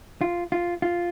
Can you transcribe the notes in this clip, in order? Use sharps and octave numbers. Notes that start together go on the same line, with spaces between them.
F4
F4
F4